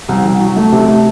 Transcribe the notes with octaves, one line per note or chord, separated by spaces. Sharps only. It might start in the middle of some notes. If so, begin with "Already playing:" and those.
C2
C2
F#3
A3
C3
A3